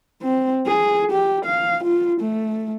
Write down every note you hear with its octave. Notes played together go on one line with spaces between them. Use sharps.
C4
G#4
G4
F5
F4
A3